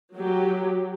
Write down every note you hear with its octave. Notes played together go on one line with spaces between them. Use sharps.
F#3 G4